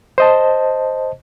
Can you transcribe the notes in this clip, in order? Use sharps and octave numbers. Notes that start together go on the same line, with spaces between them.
C5 D#5 A5